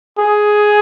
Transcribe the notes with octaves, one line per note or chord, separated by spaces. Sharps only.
G#4